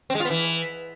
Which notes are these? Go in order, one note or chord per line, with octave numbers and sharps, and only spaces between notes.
C4
G#3
F4
B3
E3